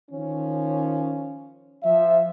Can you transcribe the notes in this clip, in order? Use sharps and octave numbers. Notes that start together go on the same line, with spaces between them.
D#3 F3 C#4
F3 E5